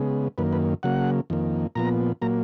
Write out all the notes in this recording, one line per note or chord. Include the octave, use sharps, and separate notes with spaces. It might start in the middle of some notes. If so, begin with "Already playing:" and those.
Already playing: C#3 G#3 B3
F#2 D#3 A#3 B4
B4
C#3 F#3 A#3 F#5
F2 D#3 A#3
A#2 F3 B3 A#5
A#2 F#3 A#3 A#5